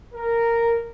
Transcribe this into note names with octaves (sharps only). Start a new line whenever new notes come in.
A#4